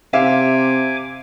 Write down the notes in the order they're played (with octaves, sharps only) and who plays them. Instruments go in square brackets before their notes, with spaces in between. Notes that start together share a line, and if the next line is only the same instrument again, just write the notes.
[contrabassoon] C3 [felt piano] E5 F5 [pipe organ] G#5 D6